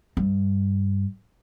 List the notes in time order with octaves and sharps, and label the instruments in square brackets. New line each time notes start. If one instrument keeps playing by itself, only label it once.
[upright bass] G2